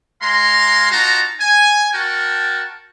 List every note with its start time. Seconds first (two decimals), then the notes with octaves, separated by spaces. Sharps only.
0.22 G#3 F5 A#5 C6
0.90 D#4 F4 F#4 A5 A#5
1.40 G#5
1.93 F#4 A#4 G5 A5